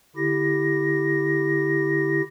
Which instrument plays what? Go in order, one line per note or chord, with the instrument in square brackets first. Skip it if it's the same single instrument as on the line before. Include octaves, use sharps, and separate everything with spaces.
[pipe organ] D3 E4 G4 A#6